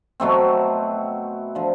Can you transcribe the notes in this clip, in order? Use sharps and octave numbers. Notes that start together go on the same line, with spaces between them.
B2 F#3 A3 C4
D3 F3